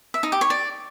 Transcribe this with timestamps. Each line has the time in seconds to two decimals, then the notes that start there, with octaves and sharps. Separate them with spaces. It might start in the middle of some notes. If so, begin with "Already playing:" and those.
0.14 E5
0.23 D#4
0.32 G4
0.41 C#5
0.50 D5